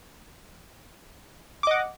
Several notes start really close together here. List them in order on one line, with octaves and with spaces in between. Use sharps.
D6 D#5 F#5